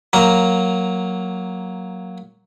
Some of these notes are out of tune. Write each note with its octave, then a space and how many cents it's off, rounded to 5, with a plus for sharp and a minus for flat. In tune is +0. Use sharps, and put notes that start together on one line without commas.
F#3 +0 A#3 +0 A#5 +0